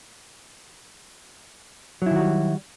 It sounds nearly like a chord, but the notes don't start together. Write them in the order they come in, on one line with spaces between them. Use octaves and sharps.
F#3 E4 D#3 F#4 G3